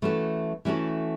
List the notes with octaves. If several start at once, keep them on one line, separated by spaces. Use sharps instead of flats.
E3 A3 C#4 F#4 A4
E3 A3 C#4 F#4 A4